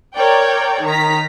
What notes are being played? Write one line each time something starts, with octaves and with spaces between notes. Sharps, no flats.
A#4 C#5 D5 G5
D#3 A#5 B6